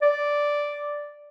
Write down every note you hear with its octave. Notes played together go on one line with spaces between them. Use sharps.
D5